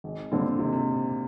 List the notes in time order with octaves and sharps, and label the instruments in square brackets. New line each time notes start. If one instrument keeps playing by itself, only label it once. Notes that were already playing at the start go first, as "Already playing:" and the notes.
[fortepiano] G#1
[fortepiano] G2 D3 G3 C4 [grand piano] A#2
[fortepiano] G#1 [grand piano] C3
[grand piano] C3